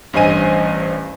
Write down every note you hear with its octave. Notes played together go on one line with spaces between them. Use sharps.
A1 G2 C5 D#5 G#5 D#7